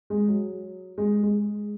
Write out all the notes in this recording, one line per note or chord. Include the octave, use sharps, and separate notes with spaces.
G#3
F#3
G#3
G#3